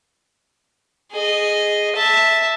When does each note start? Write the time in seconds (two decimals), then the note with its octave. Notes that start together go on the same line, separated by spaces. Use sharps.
1.12 G#4 D#5
1.95 E5 A5